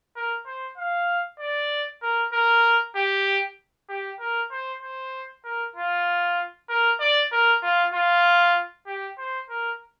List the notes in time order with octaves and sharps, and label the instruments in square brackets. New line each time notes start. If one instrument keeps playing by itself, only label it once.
[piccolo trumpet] A#4
C5
F5
D5
A#4
A#4
G4
G4
A#4
C5
C5
A#4
F4
A#4
D5
A#4
F4
F4
G4
C5
A#4